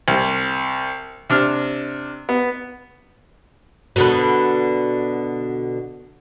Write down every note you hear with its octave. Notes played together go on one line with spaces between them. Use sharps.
C2
C3 D4 F6
B3
B2 D3 B4